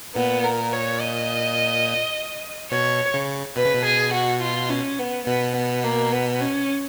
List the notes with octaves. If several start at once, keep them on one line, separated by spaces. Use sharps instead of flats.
A#2 B3
A#4
C#5
D#5
B2 C#5
C#3
B2 B4
C#3
B2
G#4
F#4
F4
C#4
B3
B2 B3
B3
A#3
B3
C#4